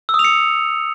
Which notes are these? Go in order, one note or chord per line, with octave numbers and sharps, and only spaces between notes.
E6
D#6
F7
C#7